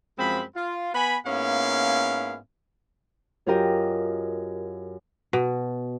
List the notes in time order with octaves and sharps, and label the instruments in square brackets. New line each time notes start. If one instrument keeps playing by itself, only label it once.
[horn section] F#2 F3 G#3 C4 B5
F4
B3 B4 G#5 B5
G#2 A#3 B3 C#4 E4 F5
[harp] F#2 F4 G4 A#4 D#5
[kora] B2